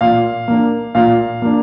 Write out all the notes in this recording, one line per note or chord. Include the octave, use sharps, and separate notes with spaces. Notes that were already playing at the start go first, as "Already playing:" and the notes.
A#2 F5
A#3 D4
A#2 F5
A#3 D4